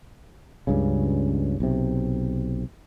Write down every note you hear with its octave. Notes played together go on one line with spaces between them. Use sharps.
C#2 G2 C#3
B1 C3